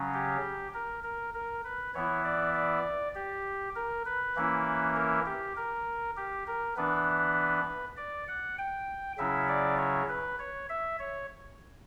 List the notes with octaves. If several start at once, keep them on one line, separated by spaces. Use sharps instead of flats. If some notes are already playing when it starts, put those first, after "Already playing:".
Already playing: C#3 F#3 C#4
G4
A#4
A#4
A#4
B4
E3 B3 E4 C#5
D5
D5
G4
A#4
B4
E3 A#3 C#4 E4
A#4
G4
A#4
G4
A#4
E3 B3 D4 B4
D5
F#5
G5
C#3 F#3 C#4 E4 E5
D5
C#5
B4
C#5
E5
C#5